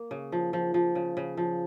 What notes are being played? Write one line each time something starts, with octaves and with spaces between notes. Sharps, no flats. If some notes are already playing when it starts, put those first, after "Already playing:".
Already playing: A#3
C#3
F3
F3
F3
C#3
C#3
F3